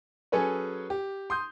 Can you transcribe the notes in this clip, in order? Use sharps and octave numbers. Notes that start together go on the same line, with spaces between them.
F#3 C#4 G#4 A4 B4 C#5
G4
C6 D#6 G6